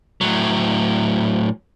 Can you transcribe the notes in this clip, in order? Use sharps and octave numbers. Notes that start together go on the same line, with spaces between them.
A2 F#3